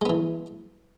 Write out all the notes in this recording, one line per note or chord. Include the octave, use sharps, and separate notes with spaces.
E3 G#3 B3